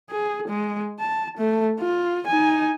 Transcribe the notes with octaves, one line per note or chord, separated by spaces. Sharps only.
G#4
G#3
A5
A3
F4
D#4 G#5